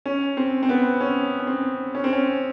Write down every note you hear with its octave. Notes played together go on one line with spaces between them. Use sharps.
C#4
C4
C4
B3
C#4
C#4
C4
C#4
C4
C#4